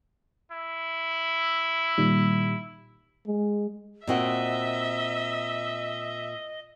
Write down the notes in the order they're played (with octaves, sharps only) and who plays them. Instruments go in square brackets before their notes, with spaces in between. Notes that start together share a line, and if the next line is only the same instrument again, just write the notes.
[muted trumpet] E4
[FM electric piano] A#2 D#3 G3
[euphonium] G#3
[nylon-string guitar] A#2 C4 F#4 [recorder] D#5 [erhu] E5